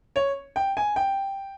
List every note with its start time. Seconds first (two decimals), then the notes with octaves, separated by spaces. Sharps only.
0.16 C#5
0.56 G5
0.77 G#5
0.96 G5